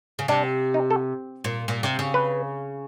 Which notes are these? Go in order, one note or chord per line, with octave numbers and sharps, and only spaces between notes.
C#3
C3 D4
D#4
A4
A#2
A#2
C3
C#3
B4